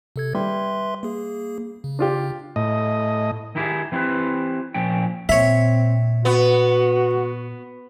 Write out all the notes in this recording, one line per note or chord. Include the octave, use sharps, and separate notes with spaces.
C3 A4 G#6
G3 B4 E5 C6
A#3 G#4
C#3
D4 F4 G4
A2 D#5
D#3 D#4 E4 G4 G#4
E3 C4 E4 G4 B4
A#2 F3 C#4 G5
A#2 C4 C#5 E5
B3 F#4